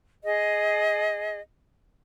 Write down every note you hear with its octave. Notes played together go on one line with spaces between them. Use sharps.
G#4 D#5